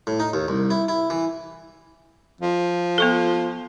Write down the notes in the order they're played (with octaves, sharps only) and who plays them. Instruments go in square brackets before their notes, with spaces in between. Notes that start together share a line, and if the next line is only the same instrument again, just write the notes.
[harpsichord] A2
D#4
D#2
C2
E4
E4
E3
[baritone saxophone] F3
[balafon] B3 F4 A4